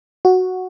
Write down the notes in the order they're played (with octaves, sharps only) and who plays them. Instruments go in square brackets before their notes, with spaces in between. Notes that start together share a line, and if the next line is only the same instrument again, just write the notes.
[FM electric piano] F#4